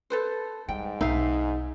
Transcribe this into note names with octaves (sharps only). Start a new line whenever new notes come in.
A4 B4 C5
G#2 G3 G5
B1 D#4 E5 F5